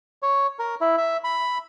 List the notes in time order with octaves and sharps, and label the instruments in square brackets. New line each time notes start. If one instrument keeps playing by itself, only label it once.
[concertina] C#5
A#4
E4
E5
B5